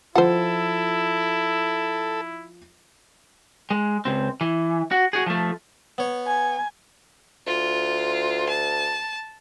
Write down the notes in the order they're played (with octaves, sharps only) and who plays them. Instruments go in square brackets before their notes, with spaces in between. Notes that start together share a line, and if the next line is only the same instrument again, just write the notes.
[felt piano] F3 F4 [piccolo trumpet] E4 [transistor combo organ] A4 [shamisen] C5 F#5
[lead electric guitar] G#3
C#2 C4
E3
F#4
F#4 G#4
F3 A3
[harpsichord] B3 C#5
[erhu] G#5
[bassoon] D2 [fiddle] F4
[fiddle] A5